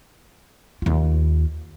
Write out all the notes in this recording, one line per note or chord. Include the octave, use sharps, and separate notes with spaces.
D#2 F4